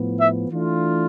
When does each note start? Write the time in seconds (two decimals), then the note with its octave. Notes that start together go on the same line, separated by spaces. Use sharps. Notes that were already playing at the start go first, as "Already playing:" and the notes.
Already playing: A2 F3 B3
0.20 E5
0.49 E3 A3 D4 F4